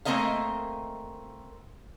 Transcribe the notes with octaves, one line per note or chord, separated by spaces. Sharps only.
A3 A#3 C4 A#4 D#5 F5